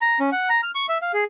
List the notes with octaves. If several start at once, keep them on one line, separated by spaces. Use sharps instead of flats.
A#5
C#4
F#5
A#5
F6
C#6
E5
F5
G#4